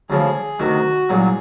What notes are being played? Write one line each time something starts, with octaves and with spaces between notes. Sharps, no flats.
D2 C#3 F3 G#4
D2 C3 D#3 F#4
C2 A#2 F#3 G#4